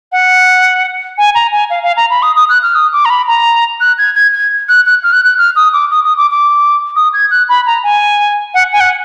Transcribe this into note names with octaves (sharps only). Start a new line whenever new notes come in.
F#5
G#5
A#5
G#5
F5
F5
A#5
B5
D#6
D#6
F#6
F6
D#6
D6
A#5
B5
A#5
F#6
G#6
G#6
G#6
F#6
F#6
F6
F#6
F#6
F6
D#6
D6
D#6
D#6
D6
D6
D#6
G#6
F#6
B5
A#5
G#5
F#5
G#5
F#5